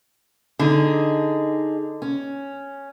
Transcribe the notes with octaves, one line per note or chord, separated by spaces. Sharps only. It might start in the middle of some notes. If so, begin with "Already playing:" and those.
D3 D#4 G#4
C#4